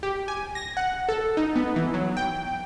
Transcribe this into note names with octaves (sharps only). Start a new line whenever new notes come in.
G4
G#5
A#6
F#5
A4
D#4
B3
E3
F#3
G5